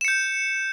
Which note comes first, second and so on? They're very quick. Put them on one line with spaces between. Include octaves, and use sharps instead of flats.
E7 C#7 G6